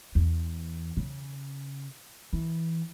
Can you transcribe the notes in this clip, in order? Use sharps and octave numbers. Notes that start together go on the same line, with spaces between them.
E2
C#3
E3